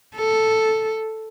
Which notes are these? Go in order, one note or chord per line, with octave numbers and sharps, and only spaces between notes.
A4